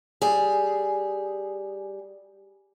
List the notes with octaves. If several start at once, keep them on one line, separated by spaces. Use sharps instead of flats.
G3 G#4